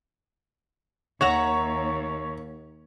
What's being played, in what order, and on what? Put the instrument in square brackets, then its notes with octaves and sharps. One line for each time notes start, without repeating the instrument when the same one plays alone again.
[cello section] D#2 [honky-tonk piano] C#5 [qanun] E5 F#5 A#5